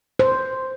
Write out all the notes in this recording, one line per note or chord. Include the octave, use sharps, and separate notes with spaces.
C5